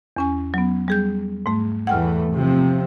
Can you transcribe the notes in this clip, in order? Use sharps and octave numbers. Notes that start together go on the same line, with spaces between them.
E2 C#4 G#5
F#3 B3
G3 G#4 G6
G#2 A3
E2 E3 A3 F#5 G5 F6
C3 F3